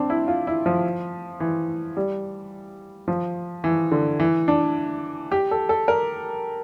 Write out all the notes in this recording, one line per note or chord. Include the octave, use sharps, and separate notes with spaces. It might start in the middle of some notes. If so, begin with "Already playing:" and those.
Already playing: C4 D4
E4
F4
E4
F3
E3
G3
F3
E3
D3
E3
D4
G4
A4
A4
A#4